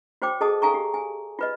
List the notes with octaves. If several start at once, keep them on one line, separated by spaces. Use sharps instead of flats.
F#4 C5 C#5 G5 D6
G#4 A4 D#5 A5 D#6
A4 F5 G#5 A#5 C#6
G4
G#5
F4 B4 D#5